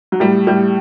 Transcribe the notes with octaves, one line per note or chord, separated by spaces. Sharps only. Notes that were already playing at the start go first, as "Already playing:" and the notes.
F#3
A2 G3
A2 G3